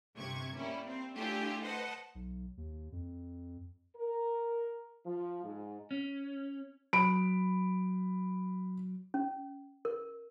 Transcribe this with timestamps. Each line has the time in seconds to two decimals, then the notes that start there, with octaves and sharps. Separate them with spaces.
0.16 G1 C3 C#6 G#6
0.56 G3 A#3 C#4 E4
0.88 C4
1.17 A3 D4 E4 F4 G4 G#4
1.63 B4 C5 D#5 F#5 A5
2.15 B1
2.57 D#2
2.92 F2
3.97 A#4
5.07 F3
5.44 G#2
5.91 C#4
6.93 F#3 B5 D7
9.14 C#4
9.85 A#4